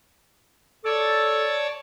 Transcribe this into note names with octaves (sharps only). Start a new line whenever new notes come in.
A4 C#5 D5 A5